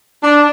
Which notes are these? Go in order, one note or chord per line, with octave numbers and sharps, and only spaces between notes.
D4